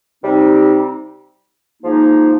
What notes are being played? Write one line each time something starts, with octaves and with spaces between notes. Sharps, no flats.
C3 G3 C4 D#4
G#2 F3 A#3 D#4